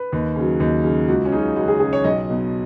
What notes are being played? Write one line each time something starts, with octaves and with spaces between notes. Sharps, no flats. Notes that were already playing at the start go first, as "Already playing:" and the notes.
Already playing: B4
D#2
C#3 F#3
D#2
C#3 F#3
C#2 F#4
C#4
C#3 F#3 D#4
C#2 F#4
G#4
C#3 F#3 G#4
C#5
B1 D#5
B2 F#3